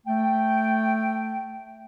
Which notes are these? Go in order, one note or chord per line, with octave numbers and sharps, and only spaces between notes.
A3 G5